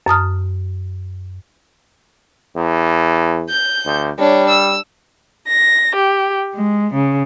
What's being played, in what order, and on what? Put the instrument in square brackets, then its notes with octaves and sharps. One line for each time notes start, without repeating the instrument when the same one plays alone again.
[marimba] F#2 A5 D#6 F6
[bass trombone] E2
[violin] G6
[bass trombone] D2
[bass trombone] G3 [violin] D4 C#5
[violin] E6
[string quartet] A#6
G4
G#3
C#3